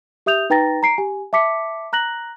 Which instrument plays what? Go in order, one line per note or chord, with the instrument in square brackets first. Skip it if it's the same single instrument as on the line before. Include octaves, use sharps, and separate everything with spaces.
[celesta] G4 E5 D#6 G6 F7
D#4 B4 G5 A#5 A6 A#6
A#5 C7 D7
G4 G#5
E5 A5 D6 B6 C#7
A#5 F#6 A#6 F#7